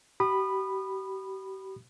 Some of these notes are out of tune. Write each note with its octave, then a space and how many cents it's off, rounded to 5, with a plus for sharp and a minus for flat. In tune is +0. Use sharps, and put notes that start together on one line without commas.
G4 -40 B5 +0 D#6 -35